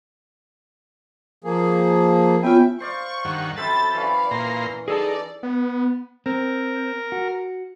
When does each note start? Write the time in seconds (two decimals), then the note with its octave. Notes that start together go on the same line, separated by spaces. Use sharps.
1.44 F3 A#3 G#4
2.43 B3 C#4 F4 E5 G5
2.80 C5 D5 F5 C#6
3.25 G2 D#3 F#5
3.57 F#2 C4 A4 B5 A6
3.94 E3 C#4 D5 F5
4.31 A#2 A#5 C6
4.88 D#4 G#4 A4 D5 A5
5.43 B3
6.26 C4 A#4
7.12 F#4